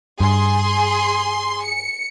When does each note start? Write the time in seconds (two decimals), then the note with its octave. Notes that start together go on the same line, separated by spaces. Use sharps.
0.20 G2 G#4 C6
1.64 C#7